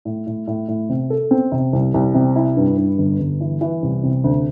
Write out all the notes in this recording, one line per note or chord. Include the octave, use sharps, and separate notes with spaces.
A2
A2
A2
A2
C3
A4
C4
C3
C2
C2
C3
E4
G2
G2
G1
G1
E3
E3
C2
C3
D2